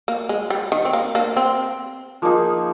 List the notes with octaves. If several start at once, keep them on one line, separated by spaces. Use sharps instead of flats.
A#3
G#3
G3
D#3
C4
A#3
A#3 D4
C4
F3 A#3 D#4 G#4